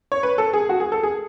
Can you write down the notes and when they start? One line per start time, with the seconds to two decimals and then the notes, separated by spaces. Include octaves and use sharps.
0.12 C#5
0.23 B4
0.38 A4
0.53 G#4
0.69 F#4
0.80 G#4
0.92 A4
1.03 G#4